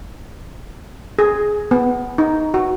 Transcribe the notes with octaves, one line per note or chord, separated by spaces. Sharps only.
G#4
B3
D#4
F#4